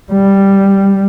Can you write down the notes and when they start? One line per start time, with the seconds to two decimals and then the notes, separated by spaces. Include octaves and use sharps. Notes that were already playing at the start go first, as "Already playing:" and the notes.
0.12 G3